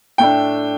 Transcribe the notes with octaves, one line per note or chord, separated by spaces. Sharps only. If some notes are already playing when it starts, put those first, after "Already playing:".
A2 A3 D4 G5